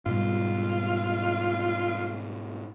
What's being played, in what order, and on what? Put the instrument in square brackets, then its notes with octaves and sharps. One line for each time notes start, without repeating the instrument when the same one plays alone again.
[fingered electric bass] G#2 B2 G3 [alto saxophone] F4